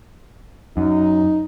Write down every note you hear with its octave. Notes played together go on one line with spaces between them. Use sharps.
F#2 D#4